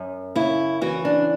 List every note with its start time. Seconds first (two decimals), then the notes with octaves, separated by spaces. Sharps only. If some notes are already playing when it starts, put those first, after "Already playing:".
Already playing: F#2
0.35 C#3 E4
0.81 E3 F#4
1.05 D4